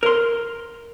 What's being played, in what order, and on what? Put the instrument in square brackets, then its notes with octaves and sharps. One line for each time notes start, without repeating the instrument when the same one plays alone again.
[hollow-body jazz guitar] A#4 C6